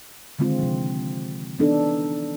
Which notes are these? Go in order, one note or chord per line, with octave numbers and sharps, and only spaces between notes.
D3 D#3 G#3 C4 F4
C3 F3
E3 B3 D4 D#4 A4